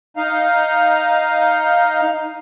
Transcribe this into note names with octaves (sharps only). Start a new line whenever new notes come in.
D#4 F5